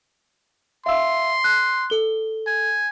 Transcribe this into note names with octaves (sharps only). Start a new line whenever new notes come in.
E5 F5 C6 E6
F#6
A4 G7
G#5